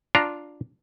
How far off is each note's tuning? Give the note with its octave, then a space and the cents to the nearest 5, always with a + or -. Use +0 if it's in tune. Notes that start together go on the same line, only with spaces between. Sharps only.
D4 +0 F4 +0 A#5 +0